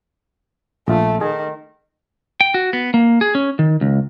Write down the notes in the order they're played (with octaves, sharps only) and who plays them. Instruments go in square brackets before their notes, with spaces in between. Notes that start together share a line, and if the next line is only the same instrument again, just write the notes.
[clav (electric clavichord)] A#1 F4 [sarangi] A3
[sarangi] D#3 [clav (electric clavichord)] G#4
[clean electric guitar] G5
F#4
B3
A#3
G#4
C#4
D#3
C#2